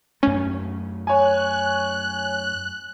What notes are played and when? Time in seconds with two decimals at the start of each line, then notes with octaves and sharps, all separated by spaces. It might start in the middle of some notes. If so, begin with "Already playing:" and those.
0.23 F#2 A3 C#4
1.07 C#5 G#5 F#6